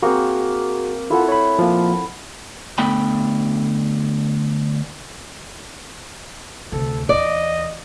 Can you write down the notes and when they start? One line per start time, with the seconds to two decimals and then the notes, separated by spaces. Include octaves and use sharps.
0.02 A#3 C4 F#4 G#4
1.10 E4 F4 A4 F#5
1.29 C#5 B5
1.59 F3 A#3
2.78 D3 A3 B3 G5 B5
6.72 D2 C3 A4
7.09 D#2 E3 D5 D#5